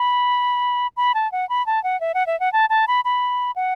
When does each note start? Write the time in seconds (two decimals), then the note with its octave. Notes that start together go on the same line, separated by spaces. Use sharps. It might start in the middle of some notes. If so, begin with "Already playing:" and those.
Already playing: B5
0.97 B5
1.14 A5
1.32 F#5
1.49 B5
1.66 A5
1.84 F#5
2.01 E5
2.14 F#5
2.27 E5
2.40 F#5
2.53 A5
2.70 A5
2.88 B5
3.05 B5
3.56 F#5